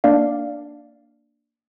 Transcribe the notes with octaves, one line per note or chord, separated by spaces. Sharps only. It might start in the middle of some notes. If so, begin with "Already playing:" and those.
A#3 D4 D5 F5